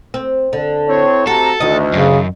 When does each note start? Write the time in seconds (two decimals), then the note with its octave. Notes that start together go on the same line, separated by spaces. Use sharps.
0.14 C4
0.53 D3
0.88 C4 E4 C#5
1.27 C3 F#4 A4 A5 A#5
1.60 D2 D#3 D#5
1.93 F#2 C#3